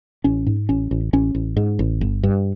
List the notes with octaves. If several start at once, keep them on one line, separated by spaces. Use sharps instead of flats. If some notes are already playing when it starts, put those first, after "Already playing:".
A1 C#4
G#2
A1 C#4
A1
A1 C#4
A1
G#2
A1
G1
G2